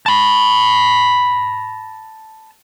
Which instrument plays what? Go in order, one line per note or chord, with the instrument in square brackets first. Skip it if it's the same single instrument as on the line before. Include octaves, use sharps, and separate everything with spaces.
[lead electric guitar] A5 B5